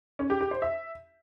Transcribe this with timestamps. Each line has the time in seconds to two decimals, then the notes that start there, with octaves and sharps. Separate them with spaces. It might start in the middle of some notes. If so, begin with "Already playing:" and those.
0.19 C#4
0.30 G4
0.41 G4
0.51 C5
0.62 E5